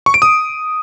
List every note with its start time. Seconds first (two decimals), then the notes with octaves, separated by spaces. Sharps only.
0.06 C#6
0.14 D7
0.22 D#6